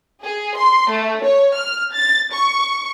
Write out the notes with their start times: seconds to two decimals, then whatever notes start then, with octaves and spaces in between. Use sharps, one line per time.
0.23 G#4
0.57 C6
0.92 A3
1.25 C#5
1.58 F6
1.94 A6
2.33 C#6